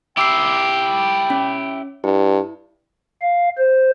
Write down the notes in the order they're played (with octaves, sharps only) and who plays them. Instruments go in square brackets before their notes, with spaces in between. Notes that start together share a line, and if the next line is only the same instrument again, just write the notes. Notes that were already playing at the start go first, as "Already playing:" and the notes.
[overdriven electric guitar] E4 G4 [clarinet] G5 [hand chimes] D6 E6 C7
[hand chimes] C#4
[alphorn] G2 [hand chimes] E4
[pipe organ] F5
C5